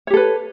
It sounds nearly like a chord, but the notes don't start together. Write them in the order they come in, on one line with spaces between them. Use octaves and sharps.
C#5 G4 A4 B4